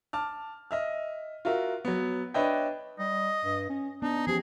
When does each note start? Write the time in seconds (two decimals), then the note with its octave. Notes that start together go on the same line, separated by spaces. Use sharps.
0.13 A5 D6 F6
0.71 D#5 E5 F6
1.45 F4 F#4 A#4 E5
1.85 F#3 B3
2.34 D4 B4 C#5 D#5 E5 G5
2.99 G3 D#5
3.45 G2
3.69 C#4
4.02 B3 D4 D#4
4.27 E3 F3 C#4 G4 G#4